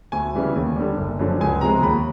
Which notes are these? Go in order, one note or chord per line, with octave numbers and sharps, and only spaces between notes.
D2 G#5
C#3 E3 G3
D#2
D3 G3
F#1
F#2 D3 F3
C#2 G#5
C3 F3 G#3 A#5
D#2 B5